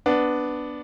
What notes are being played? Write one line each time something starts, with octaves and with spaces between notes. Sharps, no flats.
B3 D4